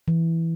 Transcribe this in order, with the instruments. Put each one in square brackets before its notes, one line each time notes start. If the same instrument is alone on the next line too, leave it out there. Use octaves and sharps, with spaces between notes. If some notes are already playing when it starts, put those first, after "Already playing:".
[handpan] E3